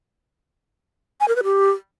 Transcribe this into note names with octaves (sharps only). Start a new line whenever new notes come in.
G#5
A#4
B4
G4